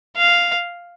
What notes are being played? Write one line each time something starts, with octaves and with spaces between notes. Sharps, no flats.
F5